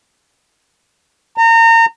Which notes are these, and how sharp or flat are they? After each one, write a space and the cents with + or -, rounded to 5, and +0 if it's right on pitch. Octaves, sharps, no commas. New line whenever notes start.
A#5 -30